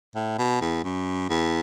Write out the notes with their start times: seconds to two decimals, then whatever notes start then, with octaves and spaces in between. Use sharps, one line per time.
0.15 A2
0.39 B2
0.61 E2
0.84 F#2
1.29 E2